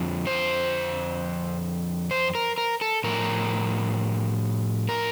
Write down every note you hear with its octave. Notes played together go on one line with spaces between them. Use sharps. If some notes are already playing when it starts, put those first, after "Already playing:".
Already playing: F2 D3 F3
C5
C5
A#4
A#4
A4
A2 F3 A#4
A#4